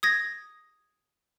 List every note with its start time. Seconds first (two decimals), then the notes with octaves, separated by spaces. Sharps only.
0.03 D#6 G#6 A#6